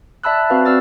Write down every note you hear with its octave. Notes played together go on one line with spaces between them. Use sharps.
D5 E5 A5 B5 E6 F#6
C4 F#4 B4 F5
C4 F#4 D5 E6 F6 A6